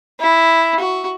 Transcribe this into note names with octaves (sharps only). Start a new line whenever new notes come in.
E4
F#4